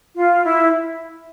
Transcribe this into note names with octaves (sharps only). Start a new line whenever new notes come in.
F4
E4